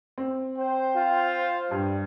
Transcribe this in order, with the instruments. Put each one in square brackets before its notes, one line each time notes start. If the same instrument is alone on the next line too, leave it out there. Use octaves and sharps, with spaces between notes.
[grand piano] C4
[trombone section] C5 [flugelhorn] G5
[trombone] F4
[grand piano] G2 [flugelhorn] G3